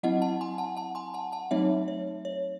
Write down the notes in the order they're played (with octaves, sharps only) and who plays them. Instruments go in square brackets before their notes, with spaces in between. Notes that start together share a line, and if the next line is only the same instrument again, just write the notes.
[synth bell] F#3 C4 E4 D#5 F#5
F#5 A5
G#5 C6
F#5 A5
F#5 A5
G#5 C6
F#5 A5
F#5 A5
F#3 A3 C4 D#4 C#5 E5
C#5
C#5